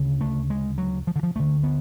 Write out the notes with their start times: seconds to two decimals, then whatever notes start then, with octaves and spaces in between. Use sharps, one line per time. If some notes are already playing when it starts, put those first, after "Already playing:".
Already playing: D2 C#3
0.21 A3
0.50 G#3
0.78 F#3
1.07 F3
1.16 D3
1.23 F3
1.36 D2 D3 A3
1.63 B3